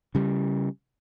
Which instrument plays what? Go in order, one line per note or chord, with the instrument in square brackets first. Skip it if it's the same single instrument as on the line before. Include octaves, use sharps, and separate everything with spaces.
[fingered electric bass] C#3 G3